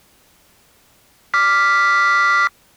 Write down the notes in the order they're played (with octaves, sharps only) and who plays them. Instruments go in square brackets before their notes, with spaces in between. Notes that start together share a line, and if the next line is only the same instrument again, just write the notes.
[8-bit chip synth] D6 F6 B6